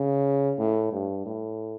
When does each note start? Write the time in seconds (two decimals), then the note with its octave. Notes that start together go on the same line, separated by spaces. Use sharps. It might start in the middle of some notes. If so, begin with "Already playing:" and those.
Already playing: C#3
0.58 A2
0.92 G2
1.25 A2